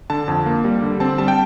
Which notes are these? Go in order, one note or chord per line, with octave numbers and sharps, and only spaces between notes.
D3 A5
F2
A#3
G3
D3
C4 A5
G3 A5
G5